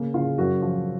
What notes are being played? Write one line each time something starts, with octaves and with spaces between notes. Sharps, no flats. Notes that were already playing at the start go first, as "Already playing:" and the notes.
Already playing: C#3 A#3
C#3 F4
F#2 F#4
F3